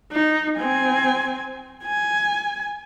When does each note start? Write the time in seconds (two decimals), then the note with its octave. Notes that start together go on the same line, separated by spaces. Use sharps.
0.12 D#4
0.59 C4 G#5
1.84 G#5